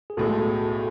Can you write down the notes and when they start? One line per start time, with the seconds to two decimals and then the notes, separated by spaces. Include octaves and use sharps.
0.10 G#4
0.17 B1 A2 G#3 F#4 A4